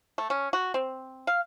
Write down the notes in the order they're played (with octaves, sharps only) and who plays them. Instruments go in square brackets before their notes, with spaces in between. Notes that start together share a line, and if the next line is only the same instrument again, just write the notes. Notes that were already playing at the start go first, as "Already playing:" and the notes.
[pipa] A3
C#4
F#4
C4
F5